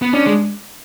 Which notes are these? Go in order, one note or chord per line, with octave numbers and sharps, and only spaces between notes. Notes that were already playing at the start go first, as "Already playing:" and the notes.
B3
C#4 D4
G#3